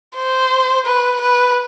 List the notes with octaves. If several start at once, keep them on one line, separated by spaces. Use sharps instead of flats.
C5
B4
B4